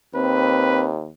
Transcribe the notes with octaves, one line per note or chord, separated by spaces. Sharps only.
D#2 C4 B4